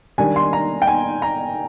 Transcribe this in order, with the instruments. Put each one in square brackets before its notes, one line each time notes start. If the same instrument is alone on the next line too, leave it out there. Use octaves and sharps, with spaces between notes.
[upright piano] D#3 G3 D4 G#5
C6
A#5
G5
G#5
A#5